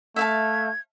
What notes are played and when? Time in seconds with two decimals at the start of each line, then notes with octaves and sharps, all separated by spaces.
0.16 A3 E5 F5 A5 G#6